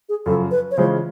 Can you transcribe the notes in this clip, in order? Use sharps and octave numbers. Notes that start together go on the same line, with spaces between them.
G#4
F#2 C#3 F3 A4
B4
C#5
C#3 E3 G#3 C#4 F4 C5